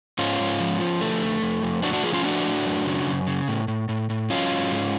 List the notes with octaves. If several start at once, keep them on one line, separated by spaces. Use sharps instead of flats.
G#2 C#4 F4
G#2
F3
F3
D3 A3
F2
F2
F2
A2 D4 F#4
D4 F#4
F3 F4 G#4
C#4 F4
A2 D4 F#4
A2
F#2
C#3
F#2
C#3
A2
A2
A2
A2
F#3 C#4 F4
G#2
G#2